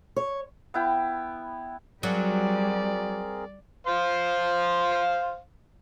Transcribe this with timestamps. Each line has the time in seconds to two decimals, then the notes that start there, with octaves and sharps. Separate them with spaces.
0.16 C#5
0.74 B3 E4 G5
2.03 F#3 G3 C4 G#4 A#4 D5
3.87 C5 F5 C6